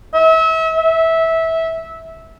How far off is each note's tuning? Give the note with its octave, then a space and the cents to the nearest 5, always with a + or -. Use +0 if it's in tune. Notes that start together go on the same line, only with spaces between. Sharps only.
E5 -35
E5 -15